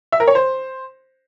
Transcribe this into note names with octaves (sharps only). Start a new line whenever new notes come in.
E5
A#4
C#5
C5